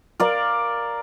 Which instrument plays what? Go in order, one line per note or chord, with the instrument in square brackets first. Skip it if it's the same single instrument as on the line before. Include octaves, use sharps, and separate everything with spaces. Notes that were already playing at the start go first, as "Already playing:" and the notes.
[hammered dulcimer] A#4 D5 F5